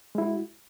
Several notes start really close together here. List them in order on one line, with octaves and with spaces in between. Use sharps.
G#3 E4 F#4